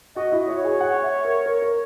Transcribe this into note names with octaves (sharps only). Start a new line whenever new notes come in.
F#4 D#5
E4
F#4 C#5
G#4
F#5
E5
A#4
A#4
A#4